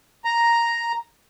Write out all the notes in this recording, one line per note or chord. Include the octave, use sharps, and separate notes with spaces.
A#5